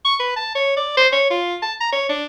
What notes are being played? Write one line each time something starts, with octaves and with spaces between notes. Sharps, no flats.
C#6
B4
A5
C#5
D5
C5
C#5
F4
A5
A#5
C#5
D4